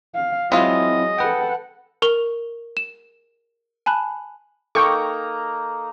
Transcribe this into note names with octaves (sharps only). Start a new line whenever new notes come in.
F5
F#3 G#3 C4 E4 F4 D#5
A4 B4 F#5 G5
A#4 C#6 F7 G7
E7
G#5 A5 B5 F#6
A#3 D#4 A4 G5 A#5 C#6